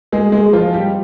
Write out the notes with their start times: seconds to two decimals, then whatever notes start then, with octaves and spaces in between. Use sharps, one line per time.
0.12 G#3 G#4
0.32 G#3 G#4
0.53 F3 F4
0.73 G3 G4